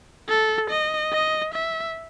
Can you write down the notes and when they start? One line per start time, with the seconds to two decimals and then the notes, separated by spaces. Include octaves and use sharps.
0.29 A4
0.70 D#5
1.13 D#5
1.54 E5